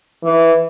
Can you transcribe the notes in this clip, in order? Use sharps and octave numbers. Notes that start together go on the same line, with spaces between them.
E3